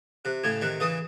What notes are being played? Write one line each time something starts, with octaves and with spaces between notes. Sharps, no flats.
C3 F#6
A2 C#3 G#6
C3 D#3 F#6
C#3 E3 D#6